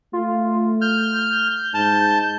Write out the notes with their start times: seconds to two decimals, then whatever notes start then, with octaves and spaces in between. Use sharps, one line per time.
0.13 A3 F4
0.81 F6 G6
1.74 G#2 A5